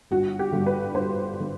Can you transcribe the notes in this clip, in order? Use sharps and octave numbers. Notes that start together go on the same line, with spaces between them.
G1 F#4
G4
G2 D3
B4
G1 C5
D3